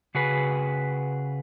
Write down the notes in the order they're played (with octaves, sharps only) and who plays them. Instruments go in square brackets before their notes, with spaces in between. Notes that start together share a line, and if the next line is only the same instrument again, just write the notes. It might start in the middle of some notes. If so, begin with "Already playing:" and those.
[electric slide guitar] C#3 F#4 G#4 B4